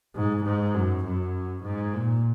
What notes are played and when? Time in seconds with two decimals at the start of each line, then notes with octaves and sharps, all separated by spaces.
0.15 G#2
0.44 G#2
0.74 F#2
1.04 F#2
1.64 G#2
1.94 A#2